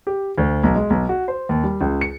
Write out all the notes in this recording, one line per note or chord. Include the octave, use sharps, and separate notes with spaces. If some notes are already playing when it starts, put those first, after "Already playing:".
G4
D2
B1
G#3
B1
F#4
C5
D#2
G3
C#2
C#7